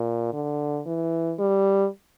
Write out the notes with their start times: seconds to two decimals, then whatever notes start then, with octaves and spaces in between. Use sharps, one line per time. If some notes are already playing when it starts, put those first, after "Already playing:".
Already playing: A#2
0.33 D3
0.86 E3
1.39 G3